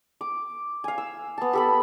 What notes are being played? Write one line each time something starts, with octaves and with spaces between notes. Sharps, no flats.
D6
F5 G#5
E6
B3 A5
G4 A4 B5